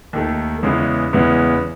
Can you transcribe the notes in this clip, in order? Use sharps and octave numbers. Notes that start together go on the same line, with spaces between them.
D#2 D#3 A3
E2 C#3 G#3 B3 E4
E2 C#3 G#3 B3 E4